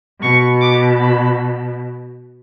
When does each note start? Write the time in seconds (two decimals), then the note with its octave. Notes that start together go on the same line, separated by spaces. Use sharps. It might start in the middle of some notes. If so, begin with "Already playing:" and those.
0.21 B2 C#6
0.60 D6
0.99 B5